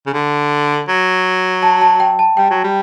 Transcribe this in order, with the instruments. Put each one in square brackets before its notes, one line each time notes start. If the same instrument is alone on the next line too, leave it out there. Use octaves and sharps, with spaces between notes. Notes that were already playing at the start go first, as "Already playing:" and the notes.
[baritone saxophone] C#3
D3
F#3
[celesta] A5
A5
G5
A5
[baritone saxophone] G3 [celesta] G5
[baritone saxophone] F#3
G3